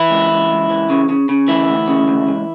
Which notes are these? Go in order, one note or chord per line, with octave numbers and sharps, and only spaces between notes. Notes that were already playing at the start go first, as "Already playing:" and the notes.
Already playing: E3 E4
C#2
C#2
C#2
E3
C#3
C#3
C#3
D2 E3 E4
D2
C#3
D2
C#2